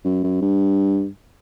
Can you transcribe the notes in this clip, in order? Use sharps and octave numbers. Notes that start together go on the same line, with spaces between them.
F#2
F#2
G2